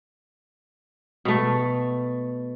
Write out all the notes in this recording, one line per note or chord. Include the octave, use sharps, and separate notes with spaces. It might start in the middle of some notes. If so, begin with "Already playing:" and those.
B2 A3